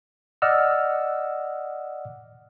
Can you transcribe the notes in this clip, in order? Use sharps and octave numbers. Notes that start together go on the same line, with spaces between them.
D5 D#5 F#5 E6 F6